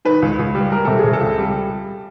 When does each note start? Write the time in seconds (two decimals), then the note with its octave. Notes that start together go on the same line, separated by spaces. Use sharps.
0.05 D#3 B4
0.22 C#2
0.39 C#2
0.55 G3
0.71 G3 A#4
0.85 C3 A4
0.99 C3 G#4
1.13 A4
1.21 C#2
1.38 G3